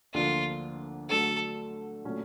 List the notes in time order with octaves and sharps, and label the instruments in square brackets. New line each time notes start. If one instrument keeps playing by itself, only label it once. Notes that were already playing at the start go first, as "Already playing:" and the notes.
[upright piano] D2 D3 F3 A#3 D4 [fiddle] F4
[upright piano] D3 F#3 A3 [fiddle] A4
[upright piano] A#2 F#3 A3 C#4